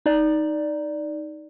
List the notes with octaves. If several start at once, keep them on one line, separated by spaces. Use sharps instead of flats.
D#4 D5